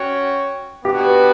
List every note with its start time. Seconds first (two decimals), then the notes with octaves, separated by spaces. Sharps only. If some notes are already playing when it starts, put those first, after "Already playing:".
Already playing: C#4 F#4 C#5 G5
0.85 B3 D4 F#4 G4
1.05 B4